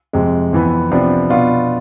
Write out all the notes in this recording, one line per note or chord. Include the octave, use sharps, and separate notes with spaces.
F2 C3 G#3
F2 E3 B3
C3 F3 B3 D4
B2 B3 D4 F4